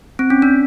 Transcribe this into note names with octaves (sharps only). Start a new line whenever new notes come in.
C4
C#4
D4